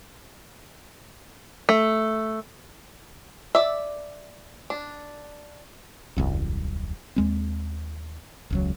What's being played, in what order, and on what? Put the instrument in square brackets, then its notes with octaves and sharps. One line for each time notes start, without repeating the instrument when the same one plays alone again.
[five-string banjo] A3
D5 E5
D4
[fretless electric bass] D#1 C2 F#2
D#2 G#3 C4
E1 C#2 F#3